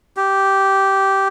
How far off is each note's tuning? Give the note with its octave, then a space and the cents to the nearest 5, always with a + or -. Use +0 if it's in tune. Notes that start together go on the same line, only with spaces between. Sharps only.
G4 -10